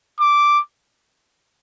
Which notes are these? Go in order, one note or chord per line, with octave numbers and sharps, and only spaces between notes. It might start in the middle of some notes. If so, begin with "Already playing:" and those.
D6